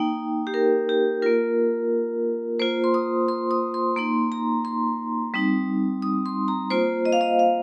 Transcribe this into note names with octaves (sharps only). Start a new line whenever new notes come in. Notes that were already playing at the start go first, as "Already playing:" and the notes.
Already playing: A#3 D#4 G5
G4
A#4
G4
A#3 F4 A#4
A#3 F4 C5
C6
D#6
C6
D#6
C6
A#3 D#4 C6
A#5
C6
G3 C4 D#4
D#6
C6
A#5
A#3 F4 C5
D#5
F5
D#5
F5